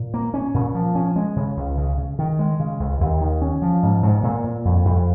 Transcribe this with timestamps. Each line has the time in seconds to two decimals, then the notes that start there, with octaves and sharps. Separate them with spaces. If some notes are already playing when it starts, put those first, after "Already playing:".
Already playing: A#2
0.14 A#3
0.34 C#4
0.54 A#2
0.75 F3
0.95 C#4
1.16 G#3
1.36 C#3
1.57 C#2
1.78 C#3
1.98 C#3
2.19 D#3
2.39 G#3
2.60 C#3
2.80 C#2
3.00 D#2
3.21 D#3
3.42 C#4
3.62 F3
3.83 G#2
4.03 G#2
4.23 A#2
4.44 A#2
4.65 F2
4.85 F2